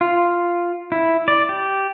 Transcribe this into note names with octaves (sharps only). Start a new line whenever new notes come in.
F4
E4
D5
G4